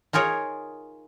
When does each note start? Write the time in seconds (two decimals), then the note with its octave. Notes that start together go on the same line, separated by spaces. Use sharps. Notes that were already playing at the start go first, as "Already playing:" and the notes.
0.13 D#4 F4 G#4 A#4 C#5